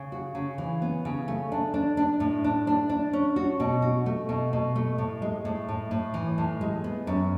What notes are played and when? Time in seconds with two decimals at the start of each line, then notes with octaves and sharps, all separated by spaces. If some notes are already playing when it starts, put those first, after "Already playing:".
Already playing: C#3
0.12 F#4
0.35 C#3
0.58 E3
0.82 B3
1.05 C#3
1.28 A3
1.52 D4
1.74 D4
1.97 D4
2.20 A2
2.44 D4
2.67 D4
2.90 D4
3.13 C#4
3.36 F#4
3.60 B2
3.82 F#4
4.06 A3
4.29 B2
4.53 B2
4.76 A3
4.98 A2
5.22 G#3
5.45 A2
5.69 A2
5.91 A2
6.14 E3
6.38 A2
6.61 G#3
6.84 B3
7.07 F#2